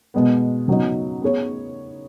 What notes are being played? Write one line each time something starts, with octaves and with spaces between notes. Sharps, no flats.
B2 G#3 B3
C#3 F#3 B3 D#4
B3 G#4 C#5